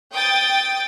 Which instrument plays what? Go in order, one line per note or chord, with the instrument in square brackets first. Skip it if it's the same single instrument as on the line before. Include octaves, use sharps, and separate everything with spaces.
[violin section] G5 D#6 A6